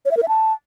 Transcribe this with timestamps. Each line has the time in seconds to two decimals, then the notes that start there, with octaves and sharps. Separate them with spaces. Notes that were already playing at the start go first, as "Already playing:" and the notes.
0.05 C#5
0.11 E5
0.17 A#4
0.23 E5
0.28 A5